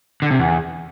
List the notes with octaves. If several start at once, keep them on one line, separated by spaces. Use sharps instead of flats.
D3
C3
E2